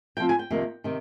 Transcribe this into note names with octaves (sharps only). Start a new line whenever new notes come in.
A#2 F3 C4 G5
G#5
G5
F2 C3 D#3 A#3
C3 D#3